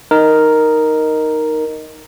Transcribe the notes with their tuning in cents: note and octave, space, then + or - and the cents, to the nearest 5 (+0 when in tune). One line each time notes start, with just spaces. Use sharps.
D#4 +0 A#4 +0 D#5 -5